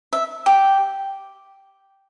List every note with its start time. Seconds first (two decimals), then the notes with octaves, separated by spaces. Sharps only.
0.13 E5
0.46 G4